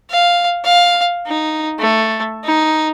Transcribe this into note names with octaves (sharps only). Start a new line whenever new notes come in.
F5
F5
D#4
A3
D#4